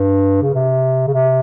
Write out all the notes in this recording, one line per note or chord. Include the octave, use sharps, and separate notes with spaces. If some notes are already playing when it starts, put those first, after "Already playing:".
Already playing: G2
C#3
C3
C#3
C3